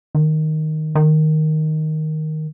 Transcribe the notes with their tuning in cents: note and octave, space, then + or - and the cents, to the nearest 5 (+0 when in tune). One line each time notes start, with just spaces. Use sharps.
D#3 +0
D#3 +0